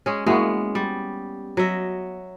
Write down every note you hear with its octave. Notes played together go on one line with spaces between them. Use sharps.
G#3 C#4
G#3 A#3 B3 E4 F#4
G3
F#3 D#5 E5